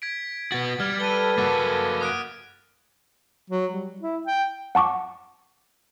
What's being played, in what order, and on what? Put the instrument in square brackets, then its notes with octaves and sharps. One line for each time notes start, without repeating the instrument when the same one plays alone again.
[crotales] G#6 B6 D7
[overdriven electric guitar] B3 F#4 [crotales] A6
[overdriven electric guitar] G3 [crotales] F6 G#6
[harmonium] A4 B4 [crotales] D#7 G7
[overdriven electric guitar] A#3 F#4 [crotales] D6 F#6 A6
[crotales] D#6 F#6 D7
[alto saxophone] F#3
G3
E4
G5
[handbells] F#5 A5 C#6 D6